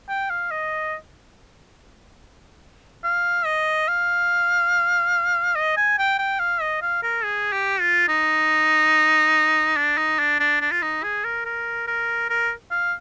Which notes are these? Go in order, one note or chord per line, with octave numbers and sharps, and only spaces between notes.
G5
F5
D#5
F5
D#5
F5
D#5
G#5
G5
G5
F5
D#5
F5
A#4
G#4
G4
F4
D#4
D4
D#4
D4
D4
D4
F4
D#4
G#4
A#4
A#4
A#4
A#4
F5